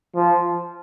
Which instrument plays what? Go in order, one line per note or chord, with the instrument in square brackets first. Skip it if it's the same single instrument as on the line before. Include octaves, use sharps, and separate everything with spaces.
[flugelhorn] F3